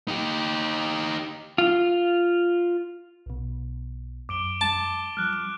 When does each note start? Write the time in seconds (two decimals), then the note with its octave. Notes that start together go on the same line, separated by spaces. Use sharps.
0.08 D#4 G4
1.58 F4
3.26 B1 B2
4.29 F#2 D6 D7 G7
4.61 A5
5.17 F3 G3 F6 F#6